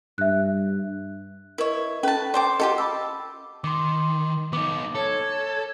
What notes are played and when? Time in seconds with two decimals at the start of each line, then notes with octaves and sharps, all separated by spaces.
0.18 G2 E5 F#6
1.58 E4 A#4 B4 C#5 D#5
2.03 C#4 A4 B4 A5
2.34 C5 D5 G5 A5 D6
2.60 F4 G4 A4 D#5 F#5
2.78 A5 B5 D6 E6
3.64 D#3 C6 D6
4.53 B3 D#4 D6
4.95 A4 C#5